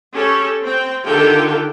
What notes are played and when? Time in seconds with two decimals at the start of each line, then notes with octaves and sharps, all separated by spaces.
0.14 C#4 G4 A4
0.62 C4 G5
1.04 D3 D#3 F4 G4 A4 G5